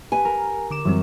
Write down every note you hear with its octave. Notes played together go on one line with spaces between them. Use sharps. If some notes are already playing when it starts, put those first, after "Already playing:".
G4 B4 G#5
A#4
D3 D6 E7
F#2 E3 G3 C4